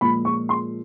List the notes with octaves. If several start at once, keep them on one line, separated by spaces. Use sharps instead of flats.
A#2 F3 G#3 B5
C#6
C6